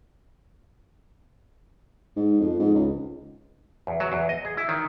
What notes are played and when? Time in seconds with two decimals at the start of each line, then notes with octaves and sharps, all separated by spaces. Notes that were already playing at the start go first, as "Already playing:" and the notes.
2.16 G#2
2.40 F2
2.59 G#2
2.75 C#2
3.87 E2
4.00 F#3
4.12 E2
4.29 D#5
4.45 G#4
4.57 E4
4.69 D#3